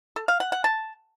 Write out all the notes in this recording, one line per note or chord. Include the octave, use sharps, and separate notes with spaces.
A4
F5
F#5
F#5
A5